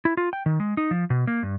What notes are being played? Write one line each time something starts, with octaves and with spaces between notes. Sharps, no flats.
E4
F4
G5
D#3
G#3
D#4
F3
B2
A#3
G2